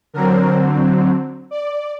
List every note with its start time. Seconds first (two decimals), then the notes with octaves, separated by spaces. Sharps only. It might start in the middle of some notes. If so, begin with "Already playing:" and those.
0.13 D3 F#3 C4 A#4
1.51 D5